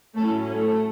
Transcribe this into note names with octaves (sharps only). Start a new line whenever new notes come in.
A2 F#3 A3 C#4 E4 A4
A3 A4